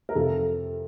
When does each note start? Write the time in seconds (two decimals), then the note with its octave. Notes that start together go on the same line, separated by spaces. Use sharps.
0.09 A#4
0.15 F2 C3 F3 A4